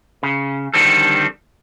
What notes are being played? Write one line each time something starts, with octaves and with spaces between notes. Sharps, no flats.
C#3
D3 D#3 G3 C4 A4